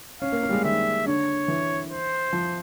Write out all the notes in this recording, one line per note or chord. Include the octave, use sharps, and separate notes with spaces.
C#4 F5
A#3
A#3
G3
G#3
D#3 E5
D3 C#5
E3
C5
F3